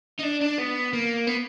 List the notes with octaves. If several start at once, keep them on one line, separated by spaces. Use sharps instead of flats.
D#4
D4
D4
B3
A#3
B3